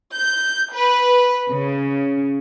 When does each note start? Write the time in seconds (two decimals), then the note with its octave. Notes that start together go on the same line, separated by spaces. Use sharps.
0.13 G6
0.73 B4
1.49 C#3